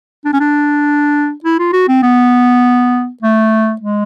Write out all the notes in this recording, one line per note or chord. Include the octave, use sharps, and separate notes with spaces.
D4
C#4
D4
E4
F4
F#4
C4
B3
A3
G#3